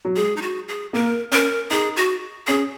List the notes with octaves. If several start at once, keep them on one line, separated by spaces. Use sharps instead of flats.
F#3
G#3 G#4
D#4
F#4
G#4
A#3 A#4
C#4 A#4
D#4 G#4
F#4
C#4 G#4